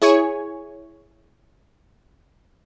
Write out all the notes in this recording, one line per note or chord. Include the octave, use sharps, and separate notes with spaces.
E4 G#4 C#5 G#5 C#6